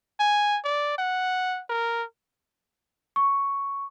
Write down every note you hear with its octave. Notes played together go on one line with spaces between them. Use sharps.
G#5
D5
F#5
A#4
C#6